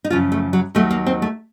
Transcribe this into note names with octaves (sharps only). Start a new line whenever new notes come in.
D#4
F#2 C#3 F3 F4
A3
F#3
D#2 D#3 F#3 A3
A#3
C4
A3